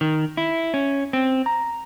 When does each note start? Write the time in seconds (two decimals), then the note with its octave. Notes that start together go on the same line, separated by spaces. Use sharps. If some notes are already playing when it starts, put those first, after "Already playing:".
0.01 D#3
0.37 E4
0.74 C#4
1.13 C4
1.46 A#5